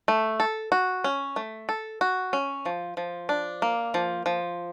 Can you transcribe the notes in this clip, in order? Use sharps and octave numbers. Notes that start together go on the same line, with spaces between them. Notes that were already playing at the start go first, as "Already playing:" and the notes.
A3
A4
F#4
C#4
A3
A4
F#4
C#4
F3
F3
D4
A#3
F3
F3